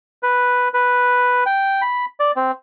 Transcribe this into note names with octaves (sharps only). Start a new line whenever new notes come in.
B4
B4
G5
B5
D5
C4